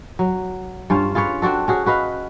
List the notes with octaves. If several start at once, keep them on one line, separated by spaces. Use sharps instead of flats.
F#3
G2 C#4 F4 C5
F4 G#4 B4 C#5
C4 D4 F#4 A4
C#4 F#4 G#4
F#4 B4 D#5 F5